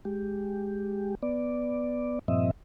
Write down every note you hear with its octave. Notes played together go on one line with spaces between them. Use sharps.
G#3 G4
B3 D5
G2 A#2 F3 C4 D#5 E5